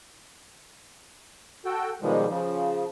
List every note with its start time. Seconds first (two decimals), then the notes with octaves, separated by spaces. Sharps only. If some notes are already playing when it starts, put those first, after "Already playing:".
1.65 F#4 A4 G5
2.02 B2 D#3 F3 G3 G#3
2.29 C#3 F3